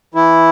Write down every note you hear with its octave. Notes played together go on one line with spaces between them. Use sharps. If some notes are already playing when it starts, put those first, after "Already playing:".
E3 E4